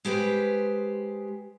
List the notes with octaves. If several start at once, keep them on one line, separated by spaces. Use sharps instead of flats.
G#3 G4 B4 C5